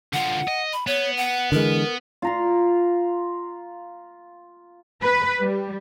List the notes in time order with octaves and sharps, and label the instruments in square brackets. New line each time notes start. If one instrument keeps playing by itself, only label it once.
[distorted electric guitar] D3 F4 [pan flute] F#5
[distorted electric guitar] D#5
[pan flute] B5
[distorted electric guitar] B3 [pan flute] C#5
[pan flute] F#5
[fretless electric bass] D3 E3 G#3 [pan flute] A#4
[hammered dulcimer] F4 A#5 C6
[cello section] B4
G3